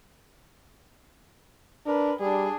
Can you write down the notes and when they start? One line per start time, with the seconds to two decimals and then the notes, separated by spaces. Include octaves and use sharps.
1.87 D4 A#4 B4
2.20 G3 D4 G#4